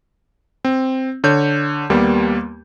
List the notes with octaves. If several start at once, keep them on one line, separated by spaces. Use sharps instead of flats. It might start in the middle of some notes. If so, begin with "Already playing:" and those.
C4
D3 C#5 G6
D#2 G3 A#3 B3